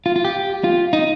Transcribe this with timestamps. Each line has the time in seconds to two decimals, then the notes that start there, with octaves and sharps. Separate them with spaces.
0.06 F4
0.16 F4
0.25 G4
0.64 F4
0.93 D#4